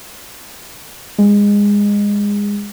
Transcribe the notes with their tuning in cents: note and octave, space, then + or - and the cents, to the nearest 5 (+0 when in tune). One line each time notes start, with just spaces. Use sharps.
G#3 -25